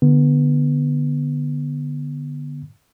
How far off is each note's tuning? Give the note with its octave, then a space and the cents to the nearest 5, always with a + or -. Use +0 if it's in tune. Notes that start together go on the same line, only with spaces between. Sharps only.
D3 +0 B3 -15